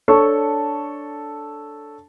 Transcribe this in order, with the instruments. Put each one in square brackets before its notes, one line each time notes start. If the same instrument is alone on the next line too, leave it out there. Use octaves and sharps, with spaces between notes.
[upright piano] D4 A4 C#5 A5 C#6